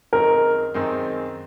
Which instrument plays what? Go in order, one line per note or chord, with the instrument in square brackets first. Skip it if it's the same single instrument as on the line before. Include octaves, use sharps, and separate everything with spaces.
[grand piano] F#2 D#3 G#3 C4 D#4 [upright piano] A#4
[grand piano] F#2 D#3 G#3 C4 D#4